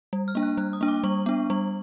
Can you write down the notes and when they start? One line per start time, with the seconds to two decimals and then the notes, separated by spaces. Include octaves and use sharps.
0.13 G3
0.28 F6
0.35 A#3 D4
0.43 F#6
0.57 G3 F#6
0.73 D#6
0.81 A#3 D4
0.88 D6
1.04 G3 C#6
1.26 B3 D4
1.50 G3 C#6